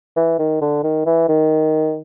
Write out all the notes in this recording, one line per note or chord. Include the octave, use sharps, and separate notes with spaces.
E3
D#3
D3
D#3
E3
D#3